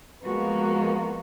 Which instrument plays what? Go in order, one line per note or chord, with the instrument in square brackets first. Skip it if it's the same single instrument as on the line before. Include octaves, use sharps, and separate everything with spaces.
[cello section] F3 G#3 F#4 [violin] A#3 B3